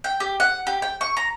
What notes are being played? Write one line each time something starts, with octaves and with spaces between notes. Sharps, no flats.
G5
G4
F#5
G4
G5
C#6
A#5